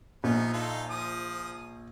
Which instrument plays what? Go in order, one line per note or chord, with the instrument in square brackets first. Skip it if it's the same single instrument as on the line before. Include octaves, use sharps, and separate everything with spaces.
[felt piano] A#1 [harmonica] F3 B3 D#4
[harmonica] D#4 F4 A4
F3 D#6